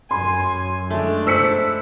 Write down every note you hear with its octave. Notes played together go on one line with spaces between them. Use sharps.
F#2 G#5 C6
G#3 A3 D4
C5 B5 E6 B6 C#7